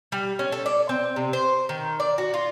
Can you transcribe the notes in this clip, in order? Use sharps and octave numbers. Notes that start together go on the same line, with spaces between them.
G3
C#4
A4
D5
C4
C3
C5
D#3
D5
F#4
F4